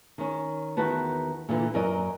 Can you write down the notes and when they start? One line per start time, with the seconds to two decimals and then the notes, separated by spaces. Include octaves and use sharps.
0.18 D#3 C#4
0.77 E2 D#3 F#4 B4 A5
1.49 A#2 D3 E3
1.74 F#2 A#4 D5 D#5